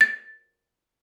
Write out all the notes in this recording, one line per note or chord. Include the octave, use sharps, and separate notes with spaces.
A6